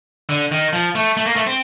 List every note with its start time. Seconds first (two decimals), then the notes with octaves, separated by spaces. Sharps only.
0.29 D3
0.51 D#3
0.73 F3
0.95 A3
1.17 A3
1.27 A#3
1.36 A3
1.46 C4